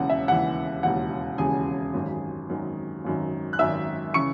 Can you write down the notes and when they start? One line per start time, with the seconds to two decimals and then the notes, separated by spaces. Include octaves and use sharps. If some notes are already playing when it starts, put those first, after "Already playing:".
Already playing: E1 D#2 C#3 E3 F#5
0.10 E5
0.28 E1 D#2 C#3 E3 F#5
0.83 E1 D#2 C#3 E3 F#5
1.38 E1 D#2 C#3 E3 G#4 G#5
1.94 G#1 F#2 D#3
2.49 G#1 F#2 D#3
3.04 G#1 F#2 D#3
3.53 F#6
3.59 G#1 F#2 D#3 E5 E6
4.14 C#3 E3 C#6 C#7